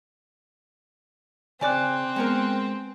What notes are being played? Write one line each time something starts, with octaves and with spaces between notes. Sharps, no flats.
C#3 C4 D5 G#5 F#6
G#3 B3 A#4